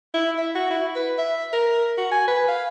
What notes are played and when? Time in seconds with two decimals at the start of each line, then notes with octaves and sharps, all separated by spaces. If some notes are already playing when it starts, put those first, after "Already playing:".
0.14 E4
0.38 E5
0.55 F#4
0.70 E4
0.95 B4
1.18 E5
1.53 A#4
1.97 F#4
2.12 G#5
2.28 B4
2.48 F5